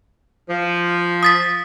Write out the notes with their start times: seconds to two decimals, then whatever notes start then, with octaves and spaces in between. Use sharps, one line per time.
0.49 F3
1.23 D#6 A6 B6